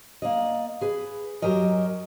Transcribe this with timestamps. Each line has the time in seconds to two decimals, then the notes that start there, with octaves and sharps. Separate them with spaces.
0.22 A#3 D5 D#5
0.81 G#4 B4
1.42 F#2 F#3 G4 A#4 D#5 G#5